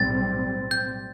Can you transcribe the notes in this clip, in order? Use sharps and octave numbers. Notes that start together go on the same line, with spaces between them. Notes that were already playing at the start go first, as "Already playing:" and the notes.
Already playing: B1 A2 G3 C4 A6
G6